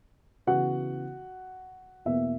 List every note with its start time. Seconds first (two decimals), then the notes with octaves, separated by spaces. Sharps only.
0.47 C#3 E3 B3 F#4 F#5
2.05 E2 B2 A#3 E5